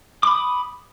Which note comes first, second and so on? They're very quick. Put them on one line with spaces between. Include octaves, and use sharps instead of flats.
D6 B5 D#6